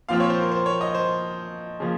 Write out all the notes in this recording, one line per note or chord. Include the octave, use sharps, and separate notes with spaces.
A#2 F3 C4 F4 F5
C#5
C5
A#4
C5
C#5
D#5
C5
C#3 F3 A#3